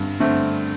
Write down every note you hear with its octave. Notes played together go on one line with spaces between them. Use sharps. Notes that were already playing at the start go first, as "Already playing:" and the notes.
Already playing: G2 D3
D3 A3 C4